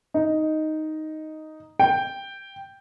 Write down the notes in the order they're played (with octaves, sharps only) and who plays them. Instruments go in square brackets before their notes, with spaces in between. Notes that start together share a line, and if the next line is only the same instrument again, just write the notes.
[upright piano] D#4
G5